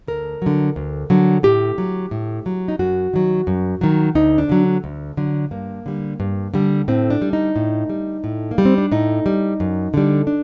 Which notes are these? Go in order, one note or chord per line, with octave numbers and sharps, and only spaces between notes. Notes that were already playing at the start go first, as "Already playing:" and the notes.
D2 A#4
D3 F#3
D2
D3 F#3
A2 G4
F#3
A2
F#3
D#4
F#2 F#4
D#3 F#3
F#2
D#3 F#3
D2 D#4
D4
D3 F#3
D2
D3 F#3
G2 A#3
D3 G3
G2
D3 G3
A2 C4
D4
G3
D#4
A2
G3
A2
A#3
G3
C4
D4
A2 D#4
G3
F#2
D3 G3
D4